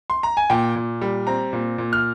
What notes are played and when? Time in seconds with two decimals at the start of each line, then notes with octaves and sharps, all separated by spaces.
0.10 C6
0.23 A#5
0.37 G#5
0.50 A#2 G5
0.76 A#2
1.01 G3
1.27 C4 A#5
1.53 A#2
1.78 A#2
1.93 F6